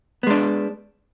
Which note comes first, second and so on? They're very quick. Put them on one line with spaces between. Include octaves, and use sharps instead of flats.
B3 G#3 D4